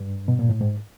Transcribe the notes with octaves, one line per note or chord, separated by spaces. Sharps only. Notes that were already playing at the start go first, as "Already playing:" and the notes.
Already playing: G2
B2
A#2
A2
G#2